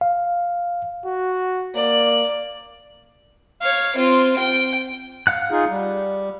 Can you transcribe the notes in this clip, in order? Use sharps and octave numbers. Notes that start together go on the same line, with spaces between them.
F5
F#4
A#3 D5
C#5 F5
C4 F4
G5
F5 F#5 F#6
D#4 F4 G#4
G3